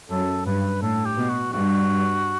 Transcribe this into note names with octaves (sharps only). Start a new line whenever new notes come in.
F#2 A4
G2 B4
A2 A4
G4
B2
F#4
G2 F#4